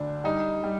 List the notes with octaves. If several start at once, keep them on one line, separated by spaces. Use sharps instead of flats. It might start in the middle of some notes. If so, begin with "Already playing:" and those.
Already playing: D2 D3 D4
G3 D#4
G3